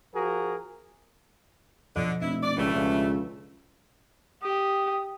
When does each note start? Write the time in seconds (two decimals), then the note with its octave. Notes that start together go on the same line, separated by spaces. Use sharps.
0.14 F3 F#4 G#4 A#4
1.96 B2 D3 F3 D#5
2.22 F1 D4 E4
2.43 D5
2.57 C#2 G2 E3 A3
2.75 C#2 F4
4.43 G4 D#6